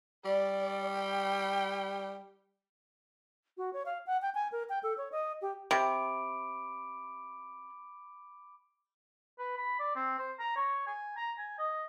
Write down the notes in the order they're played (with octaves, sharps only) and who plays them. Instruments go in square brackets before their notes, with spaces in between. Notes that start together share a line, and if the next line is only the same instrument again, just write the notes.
[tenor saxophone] G3 [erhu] D5
[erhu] G5
[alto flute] F#4
C#5
F5
F#5
G5
G#5
A#4
G5
A4
C#5
D#5
G4
[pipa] C3 [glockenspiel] B5 D6 D7
[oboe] B4
B5
D5
C4
C5
A#5
C#5
G#5
A#5
G#5
D#5